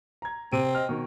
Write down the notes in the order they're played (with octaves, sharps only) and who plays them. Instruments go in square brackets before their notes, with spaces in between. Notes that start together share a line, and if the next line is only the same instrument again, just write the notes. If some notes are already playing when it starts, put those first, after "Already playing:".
[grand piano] A#5 G#6
[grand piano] C3 D7 D#7 [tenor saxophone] C4
[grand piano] D#5 F6
B2 D#3